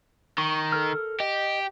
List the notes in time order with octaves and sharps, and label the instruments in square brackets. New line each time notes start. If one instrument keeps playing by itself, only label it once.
[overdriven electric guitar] D#3 [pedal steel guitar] C#6
[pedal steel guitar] A4 A#4 F6
[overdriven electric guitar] G4 [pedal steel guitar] D#5